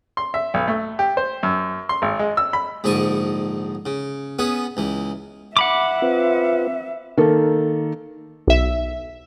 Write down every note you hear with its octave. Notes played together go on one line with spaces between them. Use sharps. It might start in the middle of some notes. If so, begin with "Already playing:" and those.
C6
E5
B1
A3
G4
C5
F#2
C6
G#1
G#3
E6
B5
A#1 G#2 D3 D5 C#6 D#6
C#3
B3 C#4 G#4 B4
C#2 E3
E5 F#5 B5 D6
C4 F4 B4
D#3 A#3 A4
B1 E5